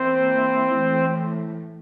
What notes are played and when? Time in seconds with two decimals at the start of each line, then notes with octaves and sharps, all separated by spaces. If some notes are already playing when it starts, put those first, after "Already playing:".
Already playing: E3 A#3 C4 E4 C5
0.73 A2 E3 A3